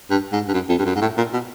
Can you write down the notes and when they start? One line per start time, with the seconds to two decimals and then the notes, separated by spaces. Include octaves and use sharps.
0.10 G2
0.33 G#2
0.48 G2
0.54 F#2
0.69 F2
0.79 G2
0.86 F#2
0.96 G#2
1.01 A2
1.17 A#2
1.33 B2